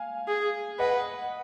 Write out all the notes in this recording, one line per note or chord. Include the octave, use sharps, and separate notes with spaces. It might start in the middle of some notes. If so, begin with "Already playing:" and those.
Already playing: F5 G#5
G#4
B4 D#5 F#5